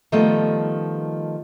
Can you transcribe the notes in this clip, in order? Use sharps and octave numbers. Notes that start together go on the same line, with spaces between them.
D#3 F3 G3 A3 B3 D#5